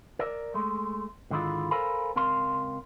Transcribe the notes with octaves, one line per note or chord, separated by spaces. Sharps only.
A#4 D5 E5
G#3 A3
G#2 D3 D#3 G#3 E4 F4
A4 A#4 C5 F5 G#5 B5
C#2 C4 A#4 F5 C6